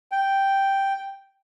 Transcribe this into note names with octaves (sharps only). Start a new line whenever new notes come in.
G5